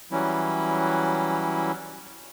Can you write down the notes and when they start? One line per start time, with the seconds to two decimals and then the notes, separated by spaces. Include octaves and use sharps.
0.11 E3 F#3 G3 C#4 E4